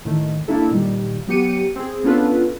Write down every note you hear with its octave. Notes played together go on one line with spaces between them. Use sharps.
A2 D#3 A3
A#3 D4 E4 A4
A#2 D#3 G3
F#3 B3 G4 C#7 D#7
C4 G#4
B3 C#4 D4 F4 A4 B4